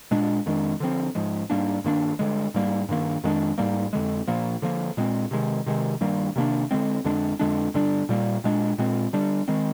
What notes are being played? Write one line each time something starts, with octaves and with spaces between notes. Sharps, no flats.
A#2 G#3 D4
F2 D#3 G#3 D4
D3 F3 C4
G#2 F3 G#3
G#2 G3 A#3 D4
G2 D#3 A#3 D4
G2 D3 G#3
G#2 G3 A#3
G2 D#3 A#3
F2 D#3 G#3 D4
G#2 G3 A#3
F2 D3 G#3
A#2 F3 A#3
D3 F3 A#3
A#2 G#3 C4
C3 D#3 G#3
C3 D#3 G#3
G2 D#3 G3 A#3
C3 D#3 A#3 D4
D3 G#3 C4
F2 D3 G#3 D4
F2 D3 G#3 D4
G2 D3 G3 D4
A#2 G3 A#3
A#2 G#3 D4
A#2 G#3 C4
D3 G3 D4
D#3 G#3 C4